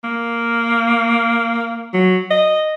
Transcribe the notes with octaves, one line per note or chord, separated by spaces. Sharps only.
A#3
F#3
D#5